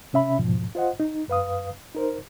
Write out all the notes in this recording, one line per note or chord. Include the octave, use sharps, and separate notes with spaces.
C3 C#4 E5 B5
E2 G#2 B2 F3
F4 C5 D#5 F#5
D#4
F#2 B4 F5 D#6
D#4 A#4 C5